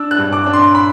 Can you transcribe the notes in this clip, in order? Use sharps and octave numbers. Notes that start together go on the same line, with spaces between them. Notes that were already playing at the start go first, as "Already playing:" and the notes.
Already playing: D4 E6
F#6
G2
D6
D4
C6
B5